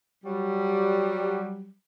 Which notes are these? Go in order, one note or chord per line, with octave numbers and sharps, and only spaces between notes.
F#3 G3